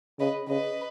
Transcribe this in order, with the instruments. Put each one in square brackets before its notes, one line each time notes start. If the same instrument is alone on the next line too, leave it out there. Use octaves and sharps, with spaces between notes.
[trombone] C#3 [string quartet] B4 D#5
[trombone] C#3 [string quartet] B4 D#5